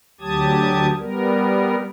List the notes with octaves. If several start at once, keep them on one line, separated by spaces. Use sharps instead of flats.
D2 F#3 G4 A5 D#6 G#6
G3 B3 A#4